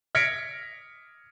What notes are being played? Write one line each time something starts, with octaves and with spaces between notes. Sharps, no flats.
F6 G#6 A#6 B6 C#7 D7